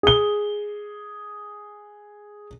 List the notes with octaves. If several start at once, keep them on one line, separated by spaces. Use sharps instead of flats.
G#4 G7